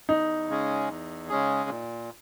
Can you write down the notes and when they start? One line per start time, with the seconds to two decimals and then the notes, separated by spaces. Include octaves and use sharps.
0.08 E2 D#4
0.49 C#3 G#3 C#4 G#4
0.89 E2
1.29 C#3 G#3 C#4 G#4
1.70 A#2